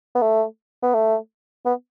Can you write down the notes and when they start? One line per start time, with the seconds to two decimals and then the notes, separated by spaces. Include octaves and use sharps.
0.16 B3
0.22 A3
0.83 B3
0.94 A3
1.66 B3